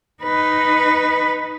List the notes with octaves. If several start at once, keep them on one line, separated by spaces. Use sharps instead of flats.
D#4 B4